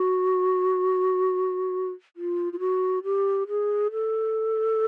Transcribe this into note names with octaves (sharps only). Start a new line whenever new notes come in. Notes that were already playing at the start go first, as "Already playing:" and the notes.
Already playing: F#4
F4
F4
F#4
G4
G#4
A4